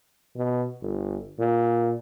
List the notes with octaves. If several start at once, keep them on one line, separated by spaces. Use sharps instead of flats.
B2
G1
A#2